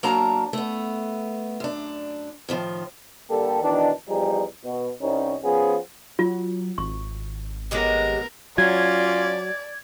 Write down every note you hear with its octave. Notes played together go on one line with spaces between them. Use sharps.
F#3 A#3 D4 A#4 A5 A#5
A3 B3
F#2 D4
A2 D#3 F3
D3 G3 A#3 G4 A4
B2 D#3 E3 D4
E2 F3 G3 D#4 G4 G#4
B2
C2 C#4 D#4
F3 B3 C#4 F4 G#4
F#3 F4
G#1 C#6
F#3 G#3 B3 G4 A#4
F#3 C#4 F4 D5 G#6